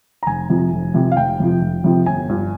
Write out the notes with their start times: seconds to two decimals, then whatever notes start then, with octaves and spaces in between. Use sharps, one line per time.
0.23 A#5
0.27 F1 G#5
0.49 F2 C3 F3
0.73 F1
0.94 F2 C3 F3
1.12 F5
1.17 F1 G5
1.40 F2 C3 F3
1.61 F1
1.84 F2 C3 F3
2.06 G1 G#5
2.29 G2 F3